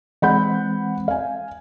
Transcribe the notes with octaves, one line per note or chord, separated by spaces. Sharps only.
E3 G#3 C4 F#5 B5 G6
F5 G#5